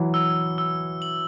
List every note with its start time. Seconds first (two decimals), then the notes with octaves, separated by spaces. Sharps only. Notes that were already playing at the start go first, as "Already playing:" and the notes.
Already playing: E3 F#3
0.14 E6
0.58 E6
1.02 F#7